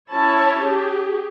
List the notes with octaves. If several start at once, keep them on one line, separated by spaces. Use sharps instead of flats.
C#4 E4 C#5 A5
G4 G#4